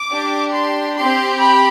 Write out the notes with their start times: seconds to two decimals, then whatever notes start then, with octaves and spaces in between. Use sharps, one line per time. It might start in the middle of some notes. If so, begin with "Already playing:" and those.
Already playing: D6
0.11 D4 G4
0.54 C6
0.97 C4 G4 C6
1.40 B5